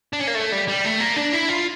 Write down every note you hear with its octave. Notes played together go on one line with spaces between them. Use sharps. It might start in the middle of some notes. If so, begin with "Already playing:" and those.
D4
C#4
A#3
A3
G3
G3
A3
A#3
D4
E4
F4